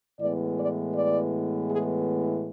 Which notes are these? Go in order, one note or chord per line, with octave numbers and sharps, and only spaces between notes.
A2 E3 G#3 B3 D5
D5
D5
G#4